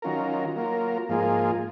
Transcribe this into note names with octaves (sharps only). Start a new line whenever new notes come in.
D#3 F#3 C#4 F4 A#4
F#3 A#3 F4 A#4
G#2 F3 A#3 F4 G#4